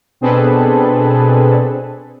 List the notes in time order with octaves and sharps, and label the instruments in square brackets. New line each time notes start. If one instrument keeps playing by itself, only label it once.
[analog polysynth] B2 C4 D4 G#4 A4 B4